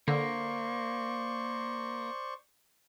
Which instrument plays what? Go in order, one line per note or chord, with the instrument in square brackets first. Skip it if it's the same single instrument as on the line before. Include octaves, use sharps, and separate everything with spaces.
[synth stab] D3 [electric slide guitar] A#3 [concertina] C5 D5 C#6